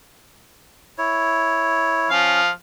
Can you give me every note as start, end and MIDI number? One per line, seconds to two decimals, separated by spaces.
0.98 2.10 64
0.98 2.10 73
2.11 2.50 53
2.11 2.41 61
2.11 2.50 77